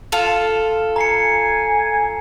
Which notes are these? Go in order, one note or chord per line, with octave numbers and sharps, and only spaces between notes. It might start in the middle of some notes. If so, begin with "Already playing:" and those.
F4 A4
G#5 A#5 C7 C#7